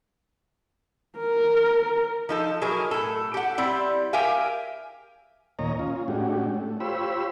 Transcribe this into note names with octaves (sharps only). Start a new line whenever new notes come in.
A#4
F3 D#4 A4
F#3 E4 G#4 A#4
A2 A4
G4 F#5
G3 C4 E4
G4 A#4 E5 F5 G5 G#5
D#2 A#2 C#5 D#5 A#5
C#4 F4
A2 G#3 C#4 D4 F#4 G4
A3
F4 G4 C5 C#5 B5 E6